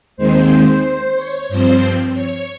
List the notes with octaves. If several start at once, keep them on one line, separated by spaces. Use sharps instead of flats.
D#2 D#3 G#3 C4 C5
C#5
G2 F3 C4 C5
C#5